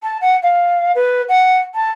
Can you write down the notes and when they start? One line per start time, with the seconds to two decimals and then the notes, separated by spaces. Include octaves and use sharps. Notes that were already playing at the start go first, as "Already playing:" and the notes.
0.02 A5
0.21 F#5
0.42 F5
0.95 B4
1.28 F#5
1.74 A5